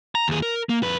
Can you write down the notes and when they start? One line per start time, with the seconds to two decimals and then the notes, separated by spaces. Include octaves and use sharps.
0.15 A#5
0.28 D#2 G#4
0.42 A#4
0.69 A#3
0.83 F2 B4